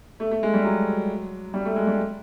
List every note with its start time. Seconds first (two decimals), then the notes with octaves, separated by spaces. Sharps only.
0.20 A3
0.31 A3
0.43 G#3
0.54 G3
0.65 F#3
1.54 G3
1.65 A3
1.76 G#3
1.87 G3